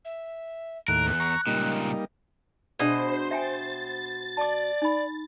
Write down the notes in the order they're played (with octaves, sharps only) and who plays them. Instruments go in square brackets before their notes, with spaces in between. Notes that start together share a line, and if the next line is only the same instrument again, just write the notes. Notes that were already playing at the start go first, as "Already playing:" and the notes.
[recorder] E5
[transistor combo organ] D#2 A2 [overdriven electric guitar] A#4 [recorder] F#6
[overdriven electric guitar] E2
[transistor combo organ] A#5 C#6
[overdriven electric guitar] C#2 A#2 [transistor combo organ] G3 A#3 D#4
[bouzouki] B2 D#5 [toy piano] D4 G#4 D5 [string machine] C5
[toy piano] E5 G5 G#5 [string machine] A6
[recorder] D5 [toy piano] A5 D6
[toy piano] D#4 B5